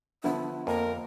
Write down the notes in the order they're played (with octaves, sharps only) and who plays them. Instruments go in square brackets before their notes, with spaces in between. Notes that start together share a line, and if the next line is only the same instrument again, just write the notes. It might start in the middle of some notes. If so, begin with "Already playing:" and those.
[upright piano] D3 F3 B3 [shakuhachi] E5
[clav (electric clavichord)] F2 [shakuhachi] A#3 [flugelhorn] A#4